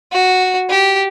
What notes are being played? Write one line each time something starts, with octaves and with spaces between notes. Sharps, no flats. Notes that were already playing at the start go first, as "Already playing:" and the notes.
F#4
G4